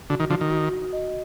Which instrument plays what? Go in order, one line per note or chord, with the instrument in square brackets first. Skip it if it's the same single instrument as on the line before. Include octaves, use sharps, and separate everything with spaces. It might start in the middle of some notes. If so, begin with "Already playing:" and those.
[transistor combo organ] D3 [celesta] F#4
[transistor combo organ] D#3
[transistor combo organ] D3 F3 [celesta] F#4
[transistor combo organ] D#3
[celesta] F#4
F#4
D#5